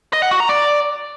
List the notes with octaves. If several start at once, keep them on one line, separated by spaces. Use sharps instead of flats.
D#5
F#5
F#4
A#5
D5